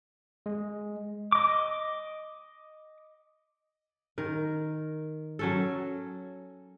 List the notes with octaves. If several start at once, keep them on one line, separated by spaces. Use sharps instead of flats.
G#3
D#5 D6
D#3 A#4
F#3 C#4 A4